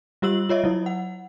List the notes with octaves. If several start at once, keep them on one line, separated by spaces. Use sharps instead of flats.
G3 F4 G4 E6 F#7
F4 C#5 D#5 E5
F#3 E4
F#5